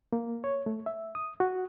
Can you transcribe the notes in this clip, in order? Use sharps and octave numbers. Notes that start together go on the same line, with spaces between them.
A#3
C#5
A3
E5
D#6
F#4